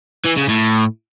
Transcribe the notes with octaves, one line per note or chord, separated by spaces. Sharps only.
E3
C#3
A2